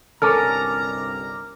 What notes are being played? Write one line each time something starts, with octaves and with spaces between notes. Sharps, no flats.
G1 C2 C#4 A4 A#4 A#5 D6 F6